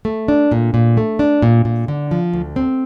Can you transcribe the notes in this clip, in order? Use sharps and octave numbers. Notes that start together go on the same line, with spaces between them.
A3
D4
A#2
A#2
A3
D4
A#2
A#2
D3
F3
D2
C4